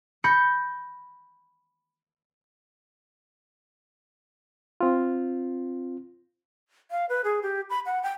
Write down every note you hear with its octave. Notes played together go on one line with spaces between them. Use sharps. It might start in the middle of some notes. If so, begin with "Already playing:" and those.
B5 G6 A#6 C#7
C4 F4
F5
B4
G#4
G4
B5
F#5
G5